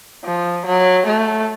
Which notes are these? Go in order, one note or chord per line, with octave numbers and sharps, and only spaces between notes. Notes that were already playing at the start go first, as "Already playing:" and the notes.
F3
F#3
A3